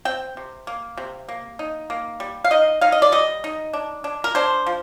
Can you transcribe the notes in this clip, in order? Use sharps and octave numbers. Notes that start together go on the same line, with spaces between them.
C4 G5
C3
A#3
C3
A#3
D#4
A#3
G3
F5
D#4 D#5
D#4 F5
D#5
D5
G3 D#5
D#4
D4
D4
A#4
D4 C5
F3